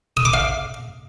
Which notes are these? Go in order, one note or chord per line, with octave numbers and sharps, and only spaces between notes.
D#6
D6
F5